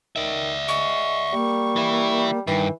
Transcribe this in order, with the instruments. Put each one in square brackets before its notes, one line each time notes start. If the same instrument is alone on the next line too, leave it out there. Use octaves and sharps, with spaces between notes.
[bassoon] D#3 [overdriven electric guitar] D5 E5
[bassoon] G#3 [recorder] C#6
[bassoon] G3 [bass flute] A#3
[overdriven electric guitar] E3 E4
[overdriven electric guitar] G2 [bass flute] D#3 [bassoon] E3 [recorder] G5